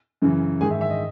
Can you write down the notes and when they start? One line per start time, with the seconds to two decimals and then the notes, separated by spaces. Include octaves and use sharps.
0.22 F#2 C#3 E3
0.61 G#2 D#3 G#4 G#5
0.71 E5
0.81 E5
0.90 D#5